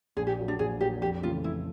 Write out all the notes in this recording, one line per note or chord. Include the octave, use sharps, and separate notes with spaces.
A#1 G#4
G4
A#2 F#3
D4
A#1 G#4
A#2 F#3 G4
F2 G4
C#3 E3 A3 F4
F2 E4